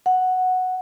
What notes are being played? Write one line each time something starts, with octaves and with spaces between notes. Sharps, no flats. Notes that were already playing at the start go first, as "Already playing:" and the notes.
F#5